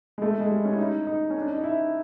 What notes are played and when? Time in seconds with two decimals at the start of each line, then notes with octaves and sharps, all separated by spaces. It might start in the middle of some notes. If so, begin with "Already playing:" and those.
0.18 G#3
0.22 A3
0.40 G#3
0.50 G3
0.65 C#4
0.73 E4
0.78 D#4
1.07 D#4
1.30 C#4
1.42 D4
1.53 D#4
1.64 E4